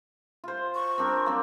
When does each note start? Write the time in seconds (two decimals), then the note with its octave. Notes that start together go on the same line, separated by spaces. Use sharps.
0.44 F4 C5
0.75 C#6
0.98 C4 D4 A#4
1.25 F#3 A#3 C4